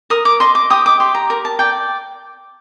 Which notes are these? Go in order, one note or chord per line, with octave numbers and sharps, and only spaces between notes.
A#4 D#6
D6
D#5 C6
D6
G4 D#6
D6
G4 C6
A#5
A#4 A#5
A5
D5 G5